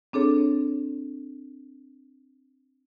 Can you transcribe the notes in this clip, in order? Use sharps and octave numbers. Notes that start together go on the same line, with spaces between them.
C4 D4 G#4 A4 C#5